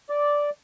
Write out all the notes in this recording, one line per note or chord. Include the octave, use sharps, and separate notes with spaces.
D5